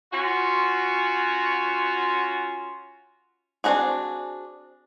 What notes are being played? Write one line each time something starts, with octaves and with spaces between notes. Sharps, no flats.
C#4 F4 F#4
C4 D4 D#4 F#4 G#4